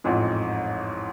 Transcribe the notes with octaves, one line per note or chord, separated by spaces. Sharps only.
A1 F2 G#2